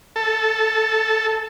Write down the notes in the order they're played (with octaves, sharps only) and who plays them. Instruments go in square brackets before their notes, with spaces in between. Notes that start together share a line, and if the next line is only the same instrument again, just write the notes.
[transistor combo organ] A4